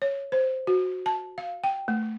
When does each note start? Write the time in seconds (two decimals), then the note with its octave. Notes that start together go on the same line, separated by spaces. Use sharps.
0.02 C#5
0.32 C5
0.67 F#4
1.06 A5
1.38 F5
1.64 G5
1.88 A3